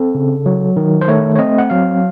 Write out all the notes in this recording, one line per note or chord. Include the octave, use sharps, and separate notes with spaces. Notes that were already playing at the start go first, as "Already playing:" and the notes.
Already playing: C4 A4
C#3
F#3
D#3
C5
A3 C#5
C#5
C4 D#5
F#5
F#3 F5